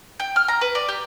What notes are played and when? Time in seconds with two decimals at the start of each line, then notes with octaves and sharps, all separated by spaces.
0.20 G5
0.36 F6
0.48 A#5
0.61 B4
0.75 D5
0.89 G4